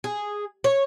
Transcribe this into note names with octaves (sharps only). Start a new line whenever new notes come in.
G#4
C#5